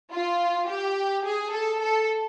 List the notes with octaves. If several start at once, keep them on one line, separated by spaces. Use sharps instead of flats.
F4
G4
G#4
A4
A4